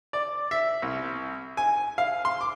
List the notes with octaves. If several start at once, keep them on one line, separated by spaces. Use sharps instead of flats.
D5
E5
C2
G#5
F5
C6
D6